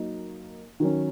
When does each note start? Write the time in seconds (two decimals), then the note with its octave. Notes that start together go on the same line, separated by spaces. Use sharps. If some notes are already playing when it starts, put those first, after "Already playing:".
Already playing: F#3 A#3 D#4
0.80 D#3 F#3 C#4